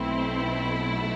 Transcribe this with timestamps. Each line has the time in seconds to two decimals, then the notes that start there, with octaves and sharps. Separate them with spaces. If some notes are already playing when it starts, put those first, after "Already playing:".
Already playing: B1 B2 A3 C4 E4